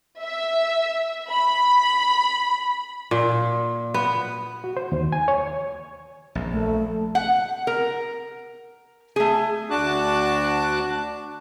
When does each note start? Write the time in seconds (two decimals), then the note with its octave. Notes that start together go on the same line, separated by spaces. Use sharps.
0.21 E5
1.28 B5
3.11 A#2
3.94 B3
4.64 F#4
4.77 C5
4.92 D#2
5.12 G#5
5.28 C#5
6.35 A#1
6.52 A3
7.15 F#5
7.67 A#4
9.16 A3 G#4
9.70 D2 D4 F#4 A5 D6 F#6